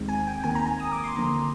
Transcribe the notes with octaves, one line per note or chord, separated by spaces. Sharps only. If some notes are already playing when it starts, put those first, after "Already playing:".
Already playing: D#2 D#3 G#3 C4
G#5
G5
D#2 D#3 A#3 G#5
A#5
G#5
D#6
D6
C6
D#2 D3 F3 A#3 A#5